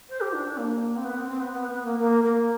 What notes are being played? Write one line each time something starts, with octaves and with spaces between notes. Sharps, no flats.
C5
G4
D4
D4
A#3
C4
B3
C4
C4
B3
B3
B3
A#3
A#3
A#3